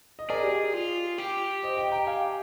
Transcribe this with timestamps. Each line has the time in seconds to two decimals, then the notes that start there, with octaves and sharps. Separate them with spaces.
0.19 D#5
0.30 G#4 A#4 D5
0.43 G4
0.74 F4
1.18 G4
1.63 C5 D#5
1.77 D#5 G5
1.92 G5 A#5
2.07 F5 G#5